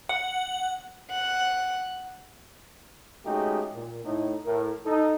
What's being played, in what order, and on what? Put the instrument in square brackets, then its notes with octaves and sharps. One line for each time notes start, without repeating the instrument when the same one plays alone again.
[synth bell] F#5
[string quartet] F#5
[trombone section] G#3 A3 C#4 D#4 F#4 G4
A#2
A2 D#4
A2 A#4
D#4 A4